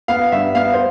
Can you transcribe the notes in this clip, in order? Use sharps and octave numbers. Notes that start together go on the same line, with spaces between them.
B3 F5
G2 E5
B3 F5
C5